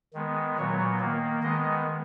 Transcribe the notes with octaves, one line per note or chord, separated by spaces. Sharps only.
D#3 G#3 B3
A#2 F#3 B3 C#5
D#3 A#3
D#3 G#3 B3 D#5